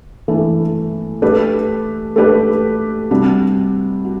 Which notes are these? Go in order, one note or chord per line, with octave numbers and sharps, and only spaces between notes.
E3 A3 D4
A3 D4 G4 B4
A3 D4 G4 B4
C3 G3 D4 F#4
F#4